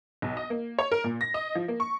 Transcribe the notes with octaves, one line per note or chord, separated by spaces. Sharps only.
B1
D#5
A#3
C#5
A#4
A#2
A#6
D#5
F3
A#3
C#6